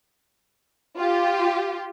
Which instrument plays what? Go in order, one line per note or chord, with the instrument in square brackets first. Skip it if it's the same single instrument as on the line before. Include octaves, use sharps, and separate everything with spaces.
[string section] F4 G4